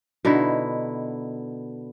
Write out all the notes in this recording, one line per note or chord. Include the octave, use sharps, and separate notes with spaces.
B2 D3 D#4 E4